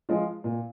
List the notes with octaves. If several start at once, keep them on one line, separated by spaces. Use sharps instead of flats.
F3 G#3 F4
A#2